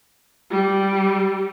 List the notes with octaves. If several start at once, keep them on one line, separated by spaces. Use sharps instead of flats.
G3